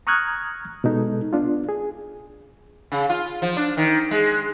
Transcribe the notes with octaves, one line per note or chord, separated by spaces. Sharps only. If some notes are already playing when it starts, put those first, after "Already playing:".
A#5 C#6 D#6 F6 F#6 G#6
B2 G#3 D#4 A4
B3 D4 F4
G#4
C#3
F4
F3
D4
D#3
G#3